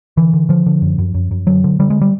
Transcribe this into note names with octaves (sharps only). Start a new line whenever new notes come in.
D3 E3
D3
D3 F3
D3
F#2
F#2
F#2
F#2
D3 F#3
D3
D3 G3
G#3
G3